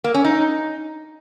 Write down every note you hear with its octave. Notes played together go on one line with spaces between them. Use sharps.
A#3
C#4
D#4